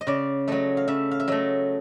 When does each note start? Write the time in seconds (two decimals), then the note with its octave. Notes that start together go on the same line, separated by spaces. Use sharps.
0.01 D#5
0.07 C#3 D5
0.48 F#3 A3 D#5
0.77 F5
0.88 C#3 E5
1.11 F5
1.20 E5
1.28 F#3 A3 D#5